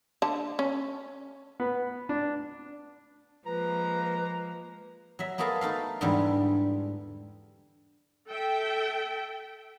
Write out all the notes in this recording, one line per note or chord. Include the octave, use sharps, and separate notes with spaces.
D3 A5
C#4
B3
D4
F3 G#3 A#3 B4 A#5
F#3 E5
A#3 B3 F#4 G#4 A4 F5
A3 D#4 A4 F5
E2 G#2 D3 E3 G3 D4
A4 E5 G5